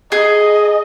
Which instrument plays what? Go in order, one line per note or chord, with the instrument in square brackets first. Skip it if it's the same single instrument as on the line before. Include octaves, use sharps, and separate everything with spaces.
[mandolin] G#4 [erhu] D#5